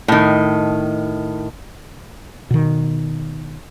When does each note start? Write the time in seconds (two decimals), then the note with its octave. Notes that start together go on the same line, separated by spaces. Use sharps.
0.08 A2 D#3
2.51 B2 D#3